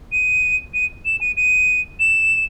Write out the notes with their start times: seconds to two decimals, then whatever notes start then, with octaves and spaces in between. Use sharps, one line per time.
0.12 D#7
0.74 D#7
1.05 E7
1.21 D#7
1.37 D#7
2.00 E7